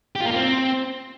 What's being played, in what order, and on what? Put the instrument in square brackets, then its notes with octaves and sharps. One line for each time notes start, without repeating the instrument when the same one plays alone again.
[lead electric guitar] G4
F4
A#3
F4
C4